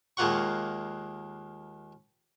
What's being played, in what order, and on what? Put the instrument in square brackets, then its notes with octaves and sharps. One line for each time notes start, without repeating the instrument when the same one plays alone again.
[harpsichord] D#2 G#3 A#3 F4 F#5 C#6